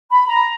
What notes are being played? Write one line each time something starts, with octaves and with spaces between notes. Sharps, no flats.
B5
A#5